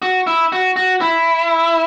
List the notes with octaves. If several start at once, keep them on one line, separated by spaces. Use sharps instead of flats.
F#4
E4
F#4
F#4
E4